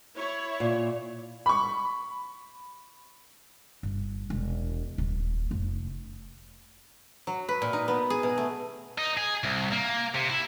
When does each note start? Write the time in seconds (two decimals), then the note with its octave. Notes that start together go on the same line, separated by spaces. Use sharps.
0.16 E4 C#5
0.60 A#2
1.46 B5 C#6
3.83 G1
4.30 E1
4.98 D#1
5.51 F1
7.27 F#3
7.49 B4
7.62 A#2
7.73 D#4
7.88 B3
8.10 G#4
8.23 B2
8.38 A3
8.98 D#4
9.17 G#4
9.43 C2
9.72 A#3
10.15 C3
10.30 E4